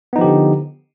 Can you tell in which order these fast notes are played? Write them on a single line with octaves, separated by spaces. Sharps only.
B3 D#4 F3 G4 D3